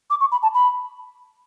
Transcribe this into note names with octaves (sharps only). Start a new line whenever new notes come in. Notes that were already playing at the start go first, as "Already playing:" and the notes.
D6
C#6
B5
A5
B5